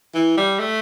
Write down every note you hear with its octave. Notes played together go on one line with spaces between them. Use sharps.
E3
G3
A3